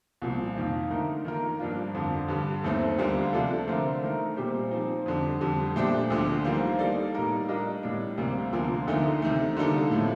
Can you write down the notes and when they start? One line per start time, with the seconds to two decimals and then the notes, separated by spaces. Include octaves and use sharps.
0.22 C2 A#2 F3
0.56 F2 D#3 A#3 F4
0.90 D3 A3 D#4 A#4
1.25 D#3 A#3 F4 A#4
1.59 G2 F3 A#3 D4 F4
1.94 F2 D3 F3
2.28 G2 D3 G3
2.64 D#2 D#3 A3 C4
2.98 D2 D3 G3 A#3 F4
3.33 C3 F3 A3 D4 A4
3.68 D3 A3 C4 F4 A#4
4.02 D#3 A3 D#4 A#4
4.36 A#2 G3 C4 G4 C5
4.71 F3 C4 D#4
5.06 F2 D3 G3
5.41 F2 D3 G3
5.76 A#2 A3 D4 G4 C5
6.10 D2 D3 F3
6.45 D#3 G3 A#3 F4 C5
6.79 G3 A#3 D#4 A4 D5
7.15 A2 G3 A#3 D#4 A#4
7.48 G3 D4 F4 A#4 D#5
7.83 A2 G3 D4
8.17 D2 C3 G3 A#3
8.53 D2 D3 F3 A#3 F4
8.87 D2 D3 A3 D#4 A#4
9.22 C3 D#3 A3
9.57 D3 G3 A#3 D#4 A4
9.91 A2 F3 A3